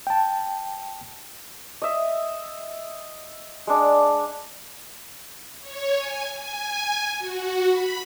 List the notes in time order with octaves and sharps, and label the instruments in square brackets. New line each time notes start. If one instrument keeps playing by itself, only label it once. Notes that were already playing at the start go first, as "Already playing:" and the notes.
[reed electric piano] G5 A5
[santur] D#5 E5
G#3 D4
[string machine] C#5
G#5
G#5
F#4
B5